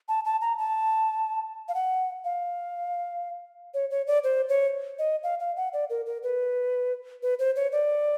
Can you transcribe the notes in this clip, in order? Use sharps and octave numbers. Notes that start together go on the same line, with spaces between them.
A5
A5
A#5
A5
F5
F#5
F5
C#5
C#5
D5
C5
C#5
D#5
F5
F5
F#5
D5
A#4
A#4
B4
B4
C5
C#5
D5